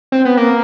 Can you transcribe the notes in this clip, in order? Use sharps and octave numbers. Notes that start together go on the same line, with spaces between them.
C4
B3
A#3